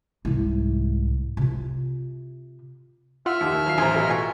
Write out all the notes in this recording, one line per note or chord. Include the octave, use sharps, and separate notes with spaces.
C2 G#2
C3 F4
F4 E5 F#5 F6
D#2 D#3
F#3 F5 C7
A1 E4 C5 G#5 A#5
B2 A4 D#5
F4 G#5 C#6